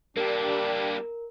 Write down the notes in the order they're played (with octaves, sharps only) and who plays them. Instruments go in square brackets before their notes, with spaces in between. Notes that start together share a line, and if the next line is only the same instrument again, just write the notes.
[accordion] G3 D4 G4 [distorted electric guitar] A#3 E4 [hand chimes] A#4